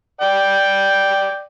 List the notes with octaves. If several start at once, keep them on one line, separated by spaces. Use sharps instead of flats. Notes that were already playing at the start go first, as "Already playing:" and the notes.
D5 G5